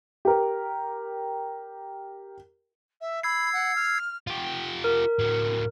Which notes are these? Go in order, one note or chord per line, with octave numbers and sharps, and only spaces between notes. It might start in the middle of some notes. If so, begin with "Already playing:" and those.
G4 A#4
E5
B5 E6 G#6 C7
F#5
F6
F4 G4
A#4
A2 F#3